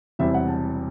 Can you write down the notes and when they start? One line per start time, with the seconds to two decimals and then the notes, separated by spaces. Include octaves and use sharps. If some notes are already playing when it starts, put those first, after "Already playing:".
0.19 E1 E2 C3 G3 C4 E5
0.34 F#5
0.48 A5